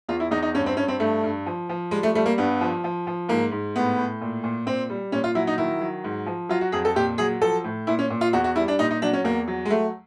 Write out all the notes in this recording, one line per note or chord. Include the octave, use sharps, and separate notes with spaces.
E2 F4
E4
E2 D#4
D#4
G2 C#4
C4
G2 C#4
C4
G2 A3
G2
F3
F3
G3 G#3
A3
G3 A3
A#3
G2 B3
F3
F3
F3
G#2 A#3
G#2
A2 B3
A2
A#2
A#2
A#2 C4
G3
A#2 C#4
F4
F#3 E4
D#4
D#3 E4
F#3
G#2
F3
F#3 F4
F#4
F2 G#4
A4
A#2 G4
F#3 G#4
F3 A4
A2
A#2 E4
C#4
A#2
F4
E2 F#4
F#4
G3 E4
D4
A#2 D#4
D#4
F#3 D4
C#4
E2 A#3
F#3
G#3
F#3 A3